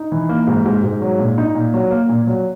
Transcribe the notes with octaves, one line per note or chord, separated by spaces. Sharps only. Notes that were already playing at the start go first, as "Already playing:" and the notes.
Already playing: D#4
E3
A#3
G#2
G#2
G#2
F#3
A#2
D#4
A#2
F#3
A#3
A#2
F#3